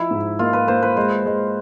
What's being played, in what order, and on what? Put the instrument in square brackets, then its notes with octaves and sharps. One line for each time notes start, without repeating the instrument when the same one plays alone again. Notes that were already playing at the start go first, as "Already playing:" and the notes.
Already playing: [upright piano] F3 [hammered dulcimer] E4
[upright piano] G#2
[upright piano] A#3 [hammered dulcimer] F4
[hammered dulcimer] B4
[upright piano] A#3 [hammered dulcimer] C5
[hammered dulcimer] B4
[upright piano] G#3 [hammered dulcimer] C5
[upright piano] G#3